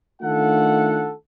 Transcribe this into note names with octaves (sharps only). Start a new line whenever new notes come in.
D#3 A3 D4 F4 A4 F#5